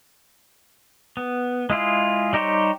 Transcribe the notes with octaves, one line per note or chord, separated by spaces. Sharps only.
B3
G#3 E4 F4 G#4
G3 D#4 G4 C5 C#5